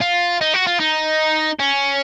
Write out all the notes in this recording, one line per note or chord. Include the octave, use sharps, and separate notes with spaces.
F4
D#4
F#4
F4
D#4
C#4